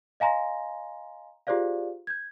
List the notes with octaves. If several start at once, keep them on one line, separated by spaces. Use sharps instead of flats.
D#5 F5 G#5 A#5 C6 A#6
F4 G4 G#4 C5 D5 F5
G6 G#6